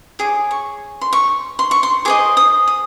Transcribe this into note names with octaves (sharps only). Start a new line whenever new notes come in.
G#4 C#5 D6
C#6
C6
C#6
C6
C#6
C6
G#4 C5 D#5 D6
D#6
D#6